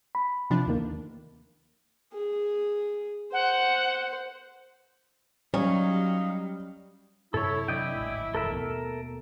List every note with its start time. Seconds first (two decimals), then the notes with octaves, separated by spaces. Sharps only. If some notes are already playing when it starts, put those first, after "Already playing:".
0.15 B5
0.50 C3 F3 D4
0.66 D#2 D#3 A#3
2.13 G#4
3.33 C5 F#5
5.54 F#3 G3 C#4 D#4 F5
7.34 F#2 C3 G3 E4 A4 C#5
7.68 C3 F#3 D4 D5 D#5 G5
7.95 D1 G#1 G#3
8.35 F1 G2 E3 A4 A#4 E5
8.51 D#2 B2 A3